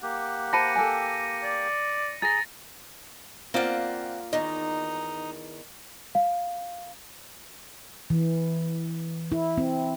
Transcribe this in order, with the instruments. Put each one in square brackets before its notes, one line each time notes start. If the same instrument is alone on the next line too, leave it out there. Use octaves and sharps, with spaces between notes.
[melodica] A#3 G4 [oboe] F#5
[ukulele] C5 A5 B5 [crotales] A#6 C#7 D#7
[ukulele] A4 G5 G#5
[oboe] D5
[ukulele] G#4 [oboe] A#5 [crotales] A6 A#6
[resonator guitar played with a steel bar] A#3 F4 D5 [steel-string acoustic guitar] C4 F#5
[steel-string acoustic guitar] E2 D#3 [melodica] D#4 [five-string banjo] D#5
[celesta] F5
[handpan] E3
E4
C4